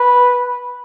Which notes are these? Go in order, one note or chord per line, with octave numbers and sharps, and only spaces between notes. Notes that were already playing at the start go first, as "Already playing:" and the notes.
Already playing: B4